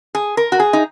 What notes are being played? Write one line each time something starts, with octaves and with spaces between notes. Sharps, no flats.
G#4
A#4
F#4
G#4
D#4